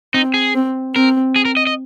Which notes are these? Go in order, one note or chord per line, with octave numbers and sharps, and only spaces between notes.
C4 D#4
G#4
C4
C4 A#4
G#4
A#4
D#5
D#5